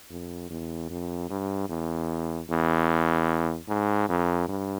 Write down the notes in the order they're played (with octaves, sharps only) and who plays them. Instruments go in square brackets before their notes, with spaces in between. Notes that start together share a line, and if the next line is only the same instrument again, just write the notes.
[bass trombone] F2
E2
F2
G2
E2
E2
G#2
F2
G2